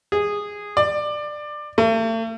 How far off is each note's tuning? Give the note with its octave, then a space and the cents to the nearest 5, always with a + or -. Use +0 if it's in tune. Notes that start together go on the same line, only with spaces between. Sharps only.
G#4 -10
D5 +20
A3 +45